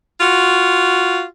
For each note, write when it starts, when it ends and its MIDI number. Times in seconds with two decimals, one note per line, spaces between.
0.20 1.23 65
0.20 1.23 66